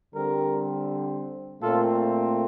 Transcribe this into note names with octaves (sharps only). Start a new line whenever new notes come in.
D3 G3 C4 G4 A#4
A#2 A3 C4 F4 A4